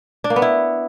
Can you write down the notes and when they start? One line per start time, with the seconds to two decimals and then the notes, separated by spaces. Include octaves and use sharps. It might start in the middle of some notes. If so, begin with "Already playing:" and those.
0.24 D4
0.30 A#3
0.36 B3
0.42 E4